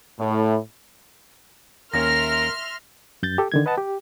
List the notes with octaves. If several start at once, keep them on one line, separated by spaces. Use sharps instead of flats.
A2
D#2 A#3 C#4 A#4 E5 C6 F6 A#6
F#2 G6 A6
G4 A4
D3 D#3 G#6
B4 D#5 F#5 A5
G4